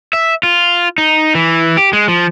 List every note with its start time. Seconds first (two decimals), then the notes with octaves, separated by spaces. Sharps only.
0.13 E5
0.43 F4
0.98 D#4
1.35 E3
1.77 G4
1.93 G#3
2.08 F3